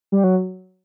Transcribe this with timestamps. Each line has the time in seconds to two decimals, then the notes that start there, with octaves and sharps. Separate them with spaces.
0.12 G3
0.24 F#3